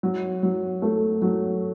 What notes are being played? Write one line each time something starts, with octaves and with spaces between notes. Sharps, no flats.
F#3
F#3
A3
F#3